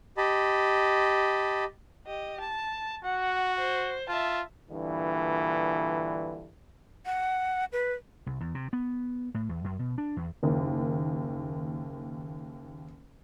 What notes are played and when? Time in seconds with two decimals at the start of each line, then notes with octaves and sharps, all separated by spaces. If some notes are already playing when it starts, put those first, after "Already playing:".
0.17 G4 D#5 A5 B5
2.07 G4 D#5
2.40 A5
3.05 F#4 F#5
3.59 C5
4.09 F4 E5 A5
4.70 G2 A#2 D3 E3
7.06 F#5
7.72 B4
8.26 C2
8.40 E2
8.55 C3
8.73 B3
9.34 A2
9.49 E2
9.64 F#2
9.79 B2
9.98 D4
10.16 E2
10.43 F#1 D#2